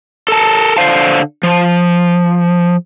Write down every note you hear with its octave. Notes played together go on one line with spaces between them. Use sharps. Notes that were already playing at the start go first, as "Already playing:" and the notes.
A4 A#4 A5
D3 C5 F5 A5
F3